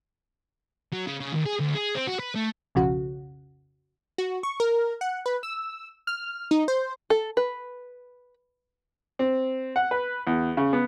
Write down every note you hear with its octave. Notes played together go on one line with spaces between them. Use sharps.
F#3
C#3
C#3
D#2
G#4
D2
G#4
C4
F#4
B4
A3
B1 F2 C#3 F#4
F#4
C#6
A#4
F#5
B4
E6
F6
D#4
C5
A4
B4
C4
F#5
B4
E2
C#3
B3